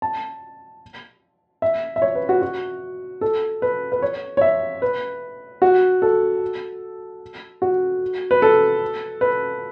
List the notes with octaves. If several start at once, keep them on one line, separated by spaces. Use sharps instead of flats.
A5
E5
E5
C#5
B4
F#4
F#4
A4
B4
B4
C#5
C#5
E5
B4
F#4
A4
F#4
B4
A4
B4